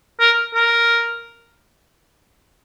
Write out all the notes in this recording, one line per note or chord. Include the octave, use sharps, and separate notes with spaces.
A#4
A#4